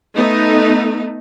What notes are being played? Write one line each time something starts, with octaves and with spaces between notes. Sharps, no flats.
A3 B3 D#4